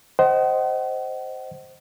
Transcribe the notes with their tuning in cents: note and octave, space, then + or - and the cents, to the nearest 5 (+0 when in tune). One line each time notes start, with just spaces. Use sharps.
C5 +0 D#5 +0 F#5 +40